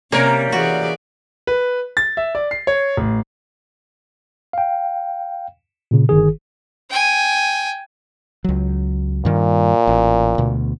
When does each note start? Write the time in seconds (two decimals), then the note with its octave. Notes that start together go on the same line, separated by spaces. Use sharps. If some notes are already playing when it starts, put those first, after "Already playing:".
0.12 C3 G3 A#3 C#4 A#4 C#5
0.52 E3 F#4 G#4 D5
1.47 B4
1.97 A6
2.17 E5
2.35 D5
2.51 C7
2.67 C#5
2.97 A1
4.53 F5 G5
5.91 A#2 C#3
6.09 G1 D#3 G#4
6.90 G5 G#5
8.44 C#2 F#3
9.25 G2 A#2 D#3 G3
9.87 A1
10.38 D2 B2